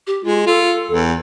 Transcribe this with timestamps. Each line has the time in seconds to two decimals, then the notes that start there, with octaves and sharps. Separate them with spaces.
0.07 G4
0.24 G#3 F4
0.46 F4 A4
0.91 E2